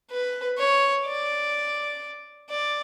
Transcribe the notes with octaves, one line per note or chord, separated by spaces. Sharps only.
B4
C#5
D5
D5